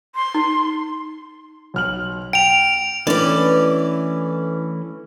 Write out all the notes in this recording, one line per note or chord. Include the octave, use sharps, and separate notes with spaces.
C6
D#4
B1 F6 F#7
G5 D7 F7
E3 A3 C#4 D4 E4 A4 B4 D5